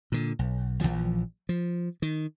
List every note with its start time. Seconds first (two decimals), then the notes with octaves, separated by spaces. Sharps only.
0.12 A#2 D3
0.39 B1
0.81 A#1 E2 E3 F3
1.49 F3
2.02 D#3